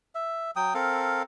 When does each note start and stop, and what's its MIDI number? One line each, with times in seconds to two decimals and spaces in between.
0.15 0.51 76
0.56 0.74 54
0.56 0.74 79
0.56 0.74 87
0.74 1.23 60
0.74 1.23 69
0.74 1.23 70
0.74 1.23 77